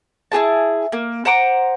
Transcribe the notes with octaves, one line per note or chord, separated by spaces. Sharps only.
E4 G4 G#4 A5
A#3
C5 F#5 A#5 D6